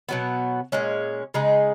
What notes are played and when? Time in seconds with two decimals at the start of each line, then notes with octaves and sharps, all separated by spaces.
0.09 B2 F#3 B3
0.72 A#2 G#3 C#4
1.34 C#3 G#3 D#4 G#4